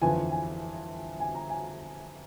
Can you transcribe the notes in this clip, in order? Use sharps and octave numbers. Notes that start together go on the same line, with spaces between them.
G1 F2 E3 G#5
G#5
G#5
A#5
G#5